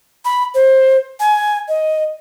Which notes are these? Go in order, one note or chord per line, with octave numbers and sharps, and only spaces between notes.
B5
C5
G#5
D#5